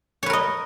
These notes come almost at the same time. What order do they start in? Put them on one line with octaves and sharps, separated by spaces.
C#5 B4 A#4 D#5